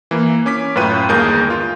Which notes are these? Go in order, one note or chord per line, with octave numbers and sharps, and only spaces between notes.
E3 A#3
C#4 D6 B6
F#2 A2 F4 B4 G5 D#7
G1 D#2 G#3 G#4 A#4 G6
F4